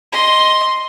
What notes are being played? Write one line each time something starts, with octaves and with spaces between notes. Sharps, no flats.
D#5 C6